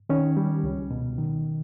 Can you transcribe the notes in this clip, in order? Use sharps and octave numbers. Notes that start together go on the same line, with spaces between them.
D#3 C#4
G3
C#2
B2
D#3